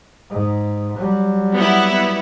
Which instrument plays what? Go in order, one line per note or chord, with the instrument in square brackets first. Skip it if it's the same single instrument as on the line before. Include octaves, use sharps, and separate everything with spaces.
[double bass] G#2
F#3 G3
[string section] B3 E4